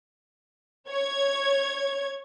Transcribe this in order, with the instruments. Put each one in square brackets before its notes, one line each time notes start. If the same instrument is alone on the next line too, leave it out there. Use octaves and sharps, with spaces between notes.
[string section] C#5 G#6